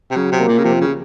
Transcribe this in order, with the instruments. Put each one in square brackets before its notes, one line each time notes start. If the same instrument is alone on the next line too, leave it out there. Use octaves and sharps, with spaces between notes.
[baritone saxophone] C3
[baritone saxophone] C#3 [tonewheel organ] F#3
[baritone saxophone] C3
[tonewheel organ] A#3
[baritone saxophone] A#2
C#3
[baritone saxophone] C3 [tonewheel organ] F3
[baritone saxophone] C#3